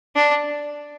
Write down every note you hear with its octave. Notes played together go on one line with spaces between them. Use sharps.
D4